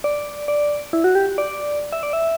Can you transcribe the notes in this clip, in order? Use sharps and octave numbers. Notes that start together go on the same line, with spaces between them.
D5
D5
E4
F#4
G4
D5
E5
D5
E5